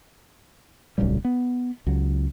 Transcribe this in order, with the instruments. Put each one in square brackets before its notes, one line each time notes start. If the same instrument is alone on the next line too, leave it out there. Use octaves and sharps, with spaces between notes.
[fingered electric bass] D1 B1 C#3 G3
B3
C#2 F#3